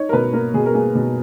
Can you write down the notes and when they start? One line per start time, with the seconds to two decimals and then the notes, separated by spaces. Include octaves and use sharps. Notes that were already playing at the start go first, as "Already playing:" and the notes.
Already playing: D#4 C#5
0.09 A#4
0.13 B2 B4
0.33 A#3 A#4
0.54 B2 G#4
0.66 A#4
0.74 A#3 G#4
0.95 B2